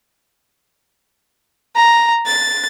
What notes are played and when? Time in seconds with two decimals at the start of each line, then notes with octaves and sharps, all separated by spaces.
1.76 A#5
2.25 A6